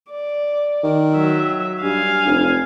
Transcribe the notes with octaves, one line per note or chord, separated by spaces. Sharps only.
D5
D#3
F#3 E5
G2 F5 G#5
F1